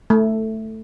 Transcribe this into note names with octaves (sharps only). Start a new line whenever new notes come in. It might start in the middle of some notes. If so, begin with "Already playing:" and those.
A3